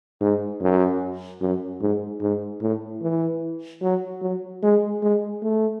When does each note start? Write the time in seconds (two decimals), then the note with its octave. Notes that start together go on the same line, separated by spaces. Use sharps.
0.21 G#2
0.61 F#2
1.41 F#2
1.81 G#2
2.22 G#2
2.62 A2
3.02 E3
3.82 F#3
4.22 F#3
4.63 G#3
5.03 G#3
5.43 A3